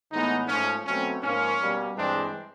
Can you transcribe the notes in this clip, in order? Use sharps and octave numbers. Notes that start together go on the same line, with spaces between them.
A2 E3 G#3 B3 D#4
G#2 F3 A3 C#4
B2 F#3 A3 C4 C#4
G#2 F3 A#3 C#4
B2 G3 A#3
G2 E3 G#3 C4 D4